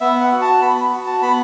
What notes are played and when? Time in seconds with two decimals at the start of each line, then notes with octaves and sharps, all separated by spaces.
0.01 B3 E5
0.21 F#5
0.32 F#4
0.41 A5
0.61 B3 B5
0.77 B5
0.92 F#4
1.06 A5
1.22 B3 B5